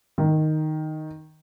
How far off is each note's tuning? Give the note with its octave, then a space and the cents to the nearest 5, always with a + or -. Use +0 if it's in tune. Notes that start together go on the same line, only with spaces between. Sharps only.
D#3 -5